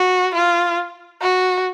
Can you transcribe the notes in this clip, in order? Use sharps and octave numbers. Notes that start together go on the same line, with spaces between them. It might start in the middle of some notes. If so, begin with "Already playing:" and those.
Already playing: F#4
F4
F#4